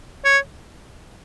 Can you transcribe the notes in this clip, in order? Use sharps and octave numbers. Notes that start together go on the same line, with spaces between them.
C#5